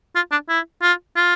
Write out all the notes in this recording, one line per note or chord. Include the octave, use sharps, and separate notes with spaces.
F4
D4
E4
F4
F4